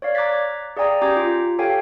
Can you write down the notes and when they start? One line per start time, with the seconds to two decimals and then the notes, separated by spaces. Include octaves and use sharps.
0.02 C#5 D5 F5
0.15 A#5 D6 F#6 G#6 A6 B6
0.77 G#4 D5 F5 G5 G#5 A#5
1.01 C#4 G4 A#5 D6 G6 G#6
1.17 F4
1.59 G4 A4 C#5 F5 G5 G#5